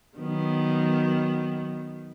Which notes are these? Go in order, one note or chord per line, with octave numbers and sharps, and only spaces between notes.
D#3 F#3 B3